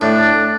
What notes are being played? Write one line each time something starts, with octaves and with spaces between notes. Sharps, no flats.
A2 D4